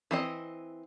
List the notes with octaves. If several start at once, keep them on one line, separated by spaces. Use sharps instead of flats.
E3 C4 D#5